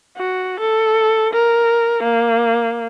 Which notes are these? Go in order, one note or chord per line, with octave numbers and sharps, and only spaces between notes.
F#4
A4
A#4
A#3